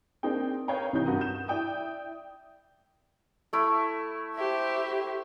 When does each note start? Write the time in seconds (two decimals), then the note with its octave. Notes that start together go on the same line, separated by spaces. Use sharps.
0.23 A#3 C4 D4 D#4 G#4 G5
0.68 A#4 B4 C#5 F5 G5 A#5
0.93 C2 C3 E3 D#4 G6
1.06 G2 F#4 A#4 D#6
1.21 G6 E7
1.48 E4 D5 G5 D#6
3.53 A3 E4
4.36 G4 C5 E5